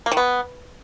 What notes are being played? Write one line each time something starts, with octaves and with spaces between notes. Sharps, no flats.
A#3
D#3
B3